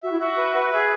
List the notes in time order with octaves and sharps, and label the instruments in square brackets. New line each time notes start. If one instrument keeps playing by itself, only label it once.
[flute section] F#4 [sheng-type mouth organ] E5
[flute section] E4
[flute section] F#4 [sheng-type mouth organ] E5
[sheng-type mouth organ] B4
B4
[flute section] G#4 [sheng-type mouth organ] E5